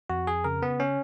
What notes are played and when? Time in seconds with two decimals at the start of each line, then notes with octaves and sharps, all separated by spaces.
0.10 F2 F#4
0.27 G#4
0.44 C#3 A#4
0.62 B3
0.80 C#4